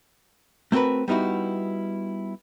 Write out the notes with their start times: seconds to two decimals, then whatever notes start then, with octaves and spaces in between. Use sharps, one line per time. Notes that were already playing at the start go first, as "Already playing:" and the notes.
0.72 A3 C4 F#4 A#4 B4
1.08 G3 B3 D#4 E4 F#4